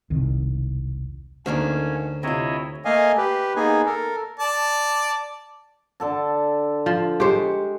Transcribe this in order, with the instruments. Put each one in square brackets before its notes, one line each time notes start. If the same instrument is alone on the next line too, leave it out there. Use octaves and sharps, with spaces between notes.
[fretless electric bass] E1 C2 D#3
[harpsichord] D2 [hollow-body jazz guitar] D3 D#3 A#3 [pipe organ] C#4
[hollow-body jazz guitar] C3 F4 [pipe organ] E4 C#5 D#5
[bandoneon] A3 A#3 D#5 F5 G#5
G4 B4
A#3 B3 D#4 G#4 G#5
A4 A#4
[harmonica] D5 A5
[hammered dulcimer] D3 A4 A5
[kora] F3
[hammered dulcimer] G#3 C#6 [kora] G4 C5